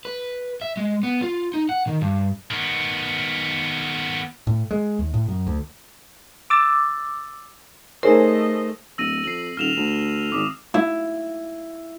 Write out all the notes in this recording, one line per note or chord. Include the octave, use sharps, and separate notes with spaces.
B4
E5
G#3
B3
F4
D#4
F#5
D#3
G2
D#3 B3
A2
G#3
D#2
A2
F#2
D2
D6 E6 A6
A3 D#4 G#4 A#4 C5 C#5 D#5
D1 E6 A#6 D#7
F2 C7 F#7
D#1 F6 E7 F7
D2
G#1 D6 D#6
E4